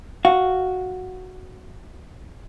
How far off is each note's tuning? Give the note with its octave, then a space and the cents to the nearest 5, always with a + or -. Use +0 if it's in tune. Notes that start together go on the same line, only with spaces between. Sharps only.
F#4 +0 F5 +0